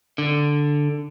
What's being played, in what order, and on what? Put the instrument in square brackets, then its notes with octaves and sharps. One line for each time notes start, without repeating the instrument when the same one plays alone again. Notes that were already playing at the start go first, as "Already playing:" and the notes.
[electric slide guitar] D3